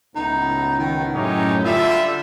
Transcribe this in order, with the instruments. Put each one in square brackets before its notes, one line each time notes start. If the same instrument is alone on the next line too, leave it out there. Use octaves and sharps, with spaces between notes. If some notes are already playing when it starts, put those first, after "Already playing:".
[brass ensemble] C#2 A2 B3 [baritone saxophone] D#4
[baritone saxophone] D#3
[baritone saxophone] F#2 [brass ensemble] A2 [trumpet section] C#4 D#4 G4
[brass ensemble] D3 [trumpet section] G3 E5 [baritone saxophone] F4